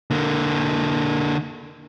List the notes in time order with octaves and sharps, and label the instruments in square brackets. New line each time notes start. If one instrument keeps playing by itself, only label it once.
[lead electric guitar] D3 A#3